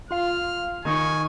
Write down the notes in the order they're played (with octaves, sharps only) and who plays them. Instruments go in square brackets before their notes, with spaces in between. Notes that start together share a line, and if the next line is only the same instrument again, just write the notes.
[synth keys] F4 F5 [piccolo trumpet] F6
[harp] D#3 D#4 C#6 [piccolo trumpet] G#5